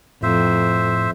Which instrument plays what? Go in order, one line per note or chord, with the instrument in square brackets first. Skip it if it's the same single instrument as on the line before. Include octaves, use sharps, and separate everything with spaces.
[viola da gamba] F2 [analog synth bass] A2 [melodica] C5 E5